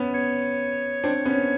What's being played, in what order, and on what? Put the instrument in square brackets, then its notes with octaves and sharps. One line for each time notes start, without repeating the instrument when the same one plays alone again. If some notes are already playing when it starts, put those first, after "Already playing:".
Already playing: [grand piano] B3 C#4
[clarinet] C#5
[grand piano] C4 D4
B3 C#4